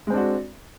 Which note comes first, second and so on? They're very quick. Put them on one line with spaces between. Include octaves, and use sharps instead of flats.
G#3 C4 D4 F#4